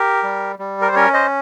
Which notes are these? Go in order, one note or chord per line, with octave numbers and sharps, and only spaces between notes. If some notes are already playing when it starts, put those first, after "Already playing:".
Already playing: G4 A#4
G3
G3
A#4
C5
C#4 A#4 C#5
C5 D#5